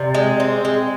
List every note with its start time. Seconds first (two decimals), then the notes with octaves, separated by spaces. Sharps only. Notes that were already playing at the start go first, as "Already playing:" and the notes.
Already playing: C3 D5
0.15 G#3
0.40 C4
0.65 G#3